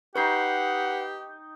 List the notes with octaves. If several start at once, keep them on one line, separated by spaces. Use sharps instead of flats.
D#4 G4 B4 F#5 G5 C#6 C7